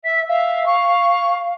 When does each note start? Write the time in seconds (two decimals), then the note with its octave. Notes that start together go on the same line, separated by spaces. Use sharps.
0.05 E5 B6
0.29 E5 F5
0.66 C#6